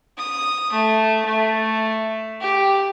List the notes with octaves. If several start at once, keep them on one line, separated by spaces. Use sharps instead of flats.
D#6
A3
A3
G4